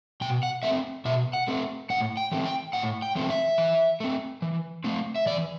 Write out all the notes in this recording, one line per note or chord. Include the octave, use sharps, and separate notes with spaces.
B2 G5
F#5
A3 C4 E5
B2 E5
F#5
A3 C4
A2 F#5
G5
E3 A3 C4
G5
A2 F#5
G5
E3 A3 C4
E5
E3
A3 C4
E3
A3 C4
E5
E3 D5